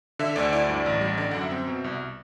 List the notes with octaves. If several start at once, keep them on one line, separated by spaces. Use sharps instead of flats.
D3 E5
D2 D5
E4 D5
G2
A1
G3
D3 D5
F#2 F#5
E5
C4
B2
C2